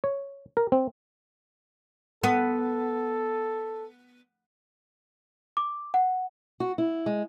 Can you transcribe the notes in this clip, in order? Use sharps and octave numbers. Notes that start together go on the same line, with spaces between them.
C#5
A#4
C4
B3 A4
D6
F#5
F#4
E4
G#3